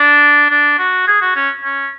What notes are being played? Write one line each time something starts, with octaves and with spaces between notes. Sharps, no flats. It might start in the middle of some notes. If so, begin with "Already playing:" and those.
Already playing: D4
D4
F#4
G#4
F#4
C#4
C#4